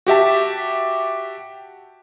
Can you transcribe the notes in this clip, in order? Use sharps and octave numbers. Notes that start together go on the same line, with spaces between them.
F#4 G4 E5 A5